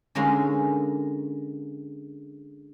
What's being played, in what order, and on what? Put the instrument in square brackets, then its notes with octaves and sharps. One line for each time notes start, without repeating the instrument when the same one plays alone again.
[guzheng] D3 G#3 A#3 C#4 D#4